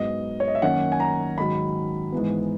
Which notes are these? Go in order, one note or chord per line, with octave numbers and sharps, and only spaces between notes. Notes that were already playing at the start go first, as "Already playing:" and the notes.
Already playing: G#2 F#3 B3 D#5
C#5
D#5
E5
F#2 D#3 A#3 C#4 F#5
G#5
A#5
G#2 D#3 F#3 B5
G#2 E3 B3